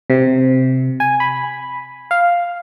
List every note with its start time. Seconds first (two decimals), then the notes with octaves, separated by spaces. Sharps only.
0.10 C3
1.00 G#5
1.20 B5
2.11 F5